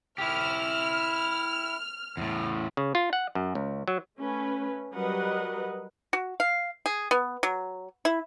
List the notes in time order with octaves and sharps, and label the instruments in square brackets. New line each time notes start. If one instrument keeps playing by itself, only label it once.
[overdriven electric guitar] E4 G4 [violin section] F6
[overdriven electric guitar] E2 A2
[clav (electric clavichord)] C#3
F4
F#5
F#2
C#2
F#3
[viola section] A3 C#4 B4
F#3 G3 A#4 B4 D#5 F#5
[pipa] F#4
F5
G#4
B3
F#3
E4